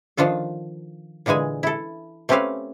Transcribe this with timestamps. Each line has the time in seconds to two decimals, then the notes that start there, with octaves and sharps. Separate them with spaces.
0.17 D#3 F3 D4 F4 A4
1.26 A#2 D3 E3 G#3 G#5
1.63 E4 A4
2.29 A3 C4 C#4 G4 B4 F5